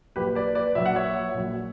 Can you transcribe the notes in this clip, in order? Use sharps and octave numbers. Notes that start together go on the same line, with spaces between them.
A#1 A#2 F#3 G4 B4
B4 D5
B4 D5
A#1 A#2 F#3 E5
F#5
C#5 E5
A#1 A#2 F#3